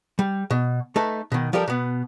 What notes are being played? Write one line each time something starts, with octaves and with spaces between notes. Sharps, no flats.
G3
B2
A3 D#4 A4 B4
B2 D#3
F3 G3 G4 A4 A#4
B2 B3